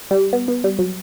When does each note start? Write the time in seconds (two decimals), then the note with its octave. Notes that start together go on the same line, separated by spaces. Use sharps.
0.11 G3
0.33 B3
0.48 B3
0.64 G3
0.79 F#3